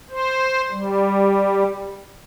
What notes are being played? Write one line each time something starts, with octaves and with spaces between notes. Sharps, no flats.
C5
G3